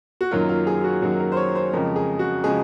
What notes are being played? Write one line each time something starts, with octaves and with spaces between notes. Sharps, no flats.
F#4
F#2 D#3 F#3 A#3 F4
F4
G#4
F#4
F#2 D#3 F#3 A#3 F#4
A#4
C5
C#5
C5
F2 C#3 F3 G#3 A#4
G#4
F#4
C#3 F3 G#3 G#4